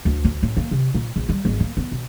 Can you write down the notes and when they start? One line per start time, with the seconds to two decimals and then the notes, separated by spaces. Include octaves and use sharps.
0.05 D2
0.25 D2
0.43 A1
0.57 A#3
0.71 C3
0.95 A#2
1.16 A#1
1.29 G3
1.45 G#1
1.60 A#3
1.77 B3
1.92 B2